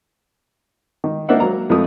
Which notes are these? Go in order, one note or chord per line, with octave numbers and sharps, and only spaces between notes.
D#3
A#3 D4 D#4 C5 E5 F#5
F#3 A#3 A#5
F2 F3 A3 E4 D#6